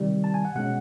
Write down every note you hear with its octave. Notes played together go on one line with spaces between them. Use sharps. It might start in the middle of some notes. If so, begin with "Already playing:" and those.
Already playing: C3 D#3 G3
A5
G#5
F#5
B2 G#3 C#4 F#5